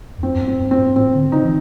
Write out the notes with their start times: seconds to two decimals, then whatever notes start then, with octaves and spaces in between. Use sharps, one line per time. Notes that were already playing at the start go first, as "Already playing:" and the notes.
0.18 F2
0.23 F#2 C4
0.35 F#2
0.41 G2
0.47 C4
0.59 G2
0.71 C4
0.78 G#2
0.96 A2 C4
1.14 D3
1.32 C#3 D#4
1.44 E3